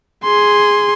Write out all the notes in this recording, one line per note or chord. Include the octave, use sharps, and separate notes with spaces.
G#4 C6